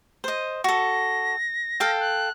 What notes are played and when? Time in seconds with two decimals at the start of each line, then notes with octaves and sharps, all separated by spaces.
0.24 C5 D#5
0.64 F#4 A4 A#6
1.80 A4 F5 G5
2.00 F#6